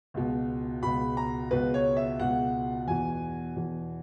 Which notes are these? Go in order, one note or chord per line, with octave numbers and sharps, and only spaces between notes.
C#2 B2
C#2 B2 B5
A#5
C#2 B2 B4
C#5
E5
C#2 B2 F#5
E2 B2 G#5
E2 B2